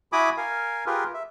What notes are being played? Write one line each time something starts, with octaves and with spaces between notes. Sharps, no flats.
E4 F#4 G#5 B5 D6 D#6
A#4 F5 G#5
F4 G4 G#4 A#4 B4
E5